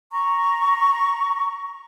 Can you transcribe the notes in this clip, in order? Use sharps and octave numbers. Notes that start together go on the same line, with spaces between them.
A#5 C#6